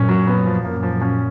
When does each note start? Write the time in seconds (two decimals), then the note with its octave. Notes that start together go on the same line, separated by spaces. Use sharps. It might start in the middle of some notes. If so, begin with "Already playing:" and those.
Already playing: F#2 A#2 C#4
0.09 F#3
0.27 B3
0.46 F3
0.64 F#2 A#2 A#3
0.83 F3
1.01 C#4